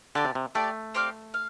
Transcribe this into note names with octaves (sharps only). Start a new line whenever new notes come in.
D3 G4 D5 A5
C3
C3
A3 G4 D5 A5
C4 G4 D5 F5
F5